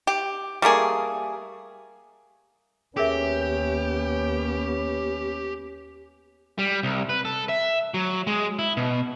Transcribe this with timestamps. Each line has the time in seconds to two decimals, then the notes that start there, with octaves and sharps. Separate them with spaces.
0.07 G4
0.62 G3 A3 A#3 G#4
2.97 D#2 B3 C#4 G4 G#4 A#4 E5
6.58 G3
6.83 C2
7.09 B4
7.25 A4
7.49 E5
7.94 F#3
8.27 G#3
8.59 E4
8.77 B2